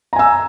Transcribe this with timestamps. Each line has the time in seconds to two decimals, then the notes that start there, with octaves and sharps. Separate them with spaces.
0.13 A#5
0.16 G#5
0.19 E6